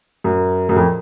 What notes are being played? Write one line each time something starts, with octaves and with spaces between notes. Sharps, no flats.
F#2
F#2
F2